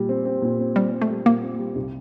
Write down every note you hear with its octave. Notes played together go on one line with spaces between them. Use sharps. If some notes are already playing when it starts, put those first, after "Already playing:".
Already playing: A#2 G3
C4
C4
A#2
C4
G3 C4
C4
A3
G3
A#2 A#3
C4
G3
C2